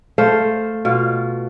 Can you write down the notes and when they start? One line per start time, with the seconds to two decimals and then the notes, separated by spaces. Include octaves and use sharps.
0.18 A3 C5 F5
0.85 B2 F4